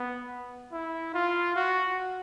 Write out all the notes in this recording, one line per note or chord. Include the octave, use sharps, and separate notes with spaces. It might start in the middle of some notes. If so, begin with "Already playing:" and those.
Already playing: B3
E4
F4
F#4